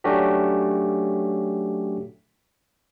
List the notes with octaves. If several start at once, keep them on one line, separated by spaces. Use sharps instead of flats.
F#3 A3 C#4 D4 F#4 G4